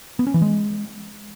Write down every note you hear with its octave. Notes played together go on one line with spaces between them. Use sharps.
B3
C#4
E3
G#3